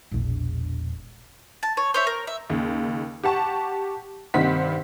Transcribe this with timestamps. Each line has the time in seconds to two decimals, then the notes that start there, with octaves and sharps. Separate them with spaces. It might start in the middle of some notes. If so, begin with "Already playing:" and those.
0.12 E1 A#1
1.63 A5
1.77 C#5
1.94 C5 C#5 E5
2.07 A#4
2.27 E5
2.50 D#2 C#3
3.24 G4 F#5 A5 C#6
4.34 G2 C3 D#3 C5 F#5 B6